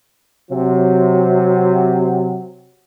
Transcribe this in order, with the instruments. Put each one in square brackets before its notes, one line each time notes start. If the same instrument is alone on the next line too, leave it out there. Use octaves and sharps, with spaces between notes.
[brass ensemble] C3 F#3